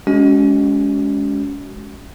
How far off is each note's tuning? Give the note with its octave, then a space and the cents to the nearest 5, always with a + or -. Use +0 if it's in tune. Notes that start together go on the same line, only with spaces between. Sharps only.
G#3 +0 C#4 +25 F#4 +30